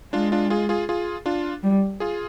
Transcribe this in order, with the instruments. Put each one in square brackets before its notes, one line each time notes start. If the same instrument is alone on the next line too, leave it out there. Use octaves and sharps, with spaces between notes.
[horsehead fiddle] G#3 [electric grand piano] D4 F4
[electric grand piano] D4 F4
F4 G#4
F4 G#4
F4 G#4
D4 F4
[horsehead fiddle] G3
[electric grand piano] F4 G#4